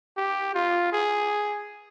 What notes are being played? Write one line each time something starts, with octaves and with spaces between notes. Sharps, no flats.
G4
F4
G#4